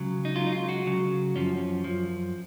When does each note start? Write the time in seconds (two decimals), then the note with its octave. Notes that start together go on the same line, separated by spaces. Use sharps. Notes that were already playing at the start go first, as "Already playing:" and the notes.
Already playing: C#2 C#3 F#3
0.25 D#4
0.36 C#2 C#3 F#3 F4
0.47 D#4
0.53 F4
0.69 F#4
0.86 C#2 C#3 F#3
1.35 F#2 F3 C#4
1.84 F#2 F3